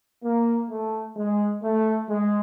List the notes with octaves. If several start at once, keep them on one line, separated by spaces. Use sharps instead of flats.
A#3
A3
G#3
A3
G#3